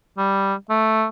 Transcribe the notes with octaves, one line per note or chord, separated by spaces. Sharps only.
G3
A3